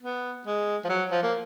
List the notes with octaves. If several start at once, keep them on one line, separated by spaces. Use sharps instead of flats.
B3
G#3
F3
F#3
F3
A#3